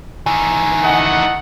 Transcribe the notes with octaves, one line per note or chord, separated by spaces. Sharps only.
D#3 E3 G#5
A3 D#5 F#5